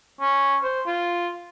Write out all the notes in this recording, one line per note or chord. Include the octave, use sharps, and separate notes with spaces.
C#4
C5
F4